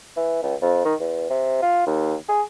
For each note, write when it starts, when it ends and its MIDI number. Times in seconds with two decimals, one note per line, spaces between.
0.17 0.42 52
0.42 0.54 37
0.62 0.81 41
0.85 0.95 51
1.00 1.27 40
1.30 1.58 48
1.62 1.86 65
1.87 2.15 39
2.28 2.42 68